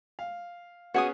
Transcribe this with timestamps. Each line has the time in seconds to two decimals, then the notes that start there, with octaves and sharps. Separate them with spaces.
0.19 F5
0.94 B3 C#4 F#4 G#4 G#5 D#6